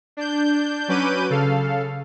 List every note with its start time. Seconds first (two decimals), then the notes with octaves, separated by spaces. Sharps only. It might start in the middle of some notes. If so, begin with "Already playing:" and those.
0.17 D4 G6
0.88 F#3 C#4 B4 D6 G6 D#7
1.30 C#3 A4 F5